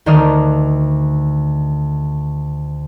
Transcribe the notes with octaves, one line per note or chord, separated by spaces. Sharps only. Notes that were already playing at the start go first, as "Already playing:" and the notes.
D2 D3 D#3 D5 D#6 F6